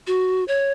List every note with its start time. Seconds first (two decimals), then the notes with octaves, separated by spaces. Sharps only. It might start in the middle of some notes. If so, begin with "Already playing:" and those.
0.07 F#4
0.48 C#5